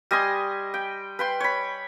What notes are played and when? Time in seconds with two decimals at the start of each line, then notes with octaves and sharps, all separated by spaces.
0.11 G3 D#5 G#5 C6
0.74 G5
1.19 B4 G5 C6
1.40 C#5 B5